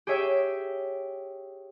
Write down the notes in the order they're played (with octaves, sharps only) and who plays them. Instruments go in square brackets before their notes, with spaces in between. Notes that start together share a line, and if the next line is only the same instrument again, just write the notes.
[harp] G4 G#4 C#5 E5 G5